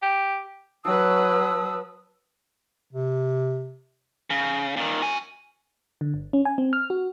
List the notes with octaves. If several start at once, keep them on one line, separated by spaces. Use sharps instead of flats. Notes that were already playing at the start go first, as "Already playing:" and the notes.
G4
F#3 B4 A5 D#6 E6
C3
C#3
A#2 D#3
F#4 G#5
D3
G1
C#4
G#5
C4
F6
F#4